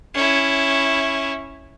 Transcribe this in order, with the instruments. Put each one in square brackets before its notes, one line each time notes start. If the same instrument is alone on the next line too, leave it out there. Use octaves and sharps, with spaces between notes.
[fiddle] C#4 E4